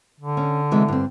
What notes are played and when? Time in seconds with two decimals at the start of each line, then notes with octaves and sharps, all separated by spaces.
0.20 D3
0.37 C#4
0.71 C3 E3 G#3
0.88 G2 C4